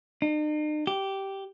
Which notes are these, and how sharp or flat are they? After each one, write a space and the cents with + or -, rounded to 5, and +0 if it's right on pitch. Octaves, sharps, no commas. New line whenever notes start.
D#4 -45
G4 -10